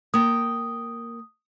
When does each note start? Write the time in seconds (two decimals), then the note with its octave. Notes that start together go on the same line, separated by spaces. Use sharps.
0.14 A#3 G5 D#6